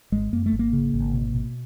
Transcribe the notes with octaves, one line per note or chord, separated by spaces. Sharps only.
G#1 G#3
F#2 A#3
A3
G#1
A#3
C#3
G#1
B2
B2